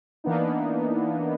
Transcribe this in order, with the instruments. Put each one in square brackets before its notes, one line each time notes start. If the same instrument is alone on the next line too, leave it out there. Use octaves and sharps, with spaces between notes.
[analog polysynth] E3 A#3 B3 D4 D#4